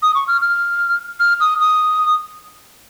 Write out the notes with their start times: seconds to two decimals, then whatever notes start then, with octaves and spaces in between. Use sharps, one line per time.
0.02 D#6
0.15 C#6
0.28 F6
0.41 F6
1.20 F6
1.40 D#6
1.60 D#6